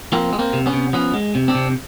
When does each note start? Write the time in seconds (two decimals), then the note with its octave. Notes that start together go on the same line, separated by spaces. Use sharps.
0.12 F3 A#3 C4
0.33 G#3
0.39 A#3 C4
0.53 C3
0.66 B3 C#4
0.73 C3
0.93 F3 B3 C#4
1.14 G#3
1.35 C3
1.48 C4 D4
1.55 C3